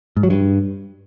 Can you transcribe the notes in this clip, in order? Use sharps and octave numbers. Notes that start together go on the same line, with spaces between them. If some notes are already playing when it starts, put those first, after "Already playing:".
G#2
F#3
G2